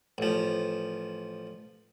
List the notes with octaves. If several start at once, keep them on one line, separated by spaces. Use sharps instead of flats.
A1 F3